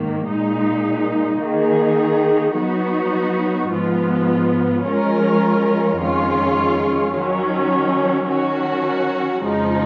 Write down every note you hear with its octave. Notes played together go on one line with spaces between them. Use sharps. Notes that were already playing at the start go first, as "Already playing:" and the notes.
Already playing: G#2 D#3 A#3
A#2 G#3 D#4
D#3 A#3 D#4 G#4
F#3 B3 D#4 F#4
G#2 F3 B3 F4
F3 G#3 C#4 F4 A#4
F2 D#3 G#3 C#4 F4
D#3 F#3 C#4
D#3 F#3 C#4 F#4
F2 C#3 F3 G#3 D#4